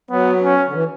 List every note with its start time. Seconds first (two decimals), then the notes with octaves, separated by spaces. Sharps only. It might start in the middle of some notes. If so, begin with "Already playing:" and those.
0.10 F#3 B3
0.43 C#4
0.67 D3
0.73 E3